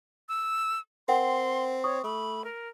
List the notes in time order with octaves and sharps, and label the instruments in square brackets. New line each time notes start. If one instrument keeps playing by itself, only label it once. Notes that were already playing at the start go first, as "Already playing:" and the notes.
[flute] E6
[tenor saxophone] C4 [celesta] A#4 F#5 G5 [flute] C6
[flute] C#5 [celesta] C#6 D#6
[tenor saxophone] A3 [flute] B5
[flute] A#4